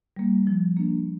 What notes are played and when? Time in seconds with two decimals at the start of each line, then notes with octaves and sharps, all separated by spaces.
0.17 G3 A#3
0.47 F3
0.77 A#3 D4